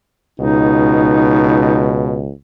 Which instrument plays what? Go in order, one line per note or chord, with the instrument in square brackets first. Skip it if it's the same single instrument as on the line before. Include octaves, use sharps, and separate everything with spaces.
[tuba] C#2 [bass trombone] B2 [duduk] D#4